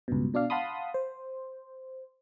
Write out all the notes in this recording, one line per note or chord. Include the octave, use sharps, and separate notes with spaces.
C#2 G2 B2
B2 D4 D5 F5
F5 F#5 A5 B5 C6 D#6
C5